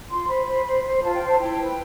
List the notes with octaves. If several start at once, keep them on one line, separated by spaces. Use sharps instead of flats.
F4 C6
C5 B5
C5
C5
C5
F4 A5
G5
C5
A5
E4 G5
B4